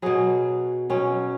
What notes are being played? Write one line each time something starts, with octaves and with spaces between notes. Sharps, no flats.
B2 F#3 G#4
B2 F#3 C#4